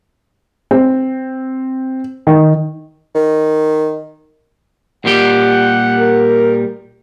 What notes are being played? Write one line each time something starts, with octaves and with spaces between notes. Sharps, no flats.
C4
D#3
D#3
A#2 G3 G4 F#5
A#4